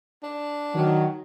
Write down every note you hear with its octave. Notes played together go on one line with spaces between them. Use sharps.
D4
D#3 F#3